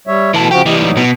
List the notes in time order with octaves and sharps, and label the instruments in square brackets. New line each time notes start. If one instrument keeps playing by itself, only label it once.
[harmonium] G3 C#5 E5
[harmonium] B2 [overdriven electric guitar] E3 A4
[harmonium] C#3 F3 F#4 [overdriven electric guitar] G4
[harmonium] C3 D#5 [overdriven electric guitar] E3 G3
[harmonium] A2 F#3 D#4
[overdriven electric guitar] B2